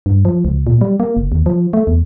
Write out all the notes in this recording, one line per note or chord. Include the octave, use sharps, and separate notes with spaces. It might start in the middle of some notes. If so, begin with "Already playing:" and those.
G2
F3
C#2
A#2
G3
A#3
F#1
D#2
F3
A3
E2